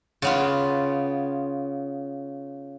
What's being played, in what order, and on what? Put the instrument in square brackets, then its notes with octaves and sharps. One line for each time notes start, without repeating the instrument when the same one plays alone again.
[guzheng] C#3 B3 F4